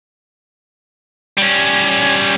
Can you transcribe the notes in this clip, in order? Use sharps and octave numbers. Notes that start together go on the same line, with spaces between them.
G3 C#4